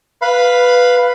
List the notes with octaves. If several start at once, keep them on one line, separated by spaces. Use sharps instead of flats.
B4 F5 B5